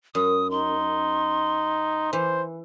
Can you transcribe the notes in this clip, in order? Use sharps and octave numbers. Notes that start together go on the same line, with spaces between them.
F#2 D#6
D#4 C6
E3 C5